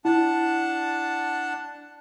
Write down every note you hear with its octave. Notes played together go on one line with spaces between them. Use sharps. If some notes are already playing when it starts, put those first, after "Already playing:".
D4 E4 F#5 A5